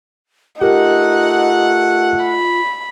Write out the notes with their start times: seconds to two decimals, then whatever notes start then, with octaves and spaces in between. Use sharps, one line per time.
0.61 A3 D#4 F4 G4 A#4 F#5
2.23 B5